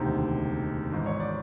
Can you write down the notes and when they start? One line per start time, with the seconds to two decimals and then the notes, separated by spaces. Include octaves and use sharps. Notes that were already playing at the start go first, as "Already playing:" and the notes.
Already playing: E1 D2 C3 D#3 C5
0.92 G#1 G#2 E3
1.06 C#5
1.20 D5